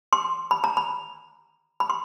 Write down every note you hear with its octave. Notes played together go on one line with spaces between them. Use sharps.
C6
B5
A#5
B5
B5
C6